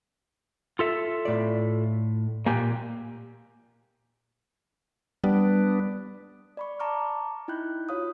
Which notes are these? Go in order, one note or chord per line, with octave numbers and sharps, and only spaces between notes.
F4 A4 E5
A2 D5
A#2 A#3 G4 G5 G#5
G3 B3 D4
D5 B5 C#6
A5 A#5 C#6 D6 F6
D#4 E4 G5 B5 F#6 G6
F4 F#4 C#5 F5 D#6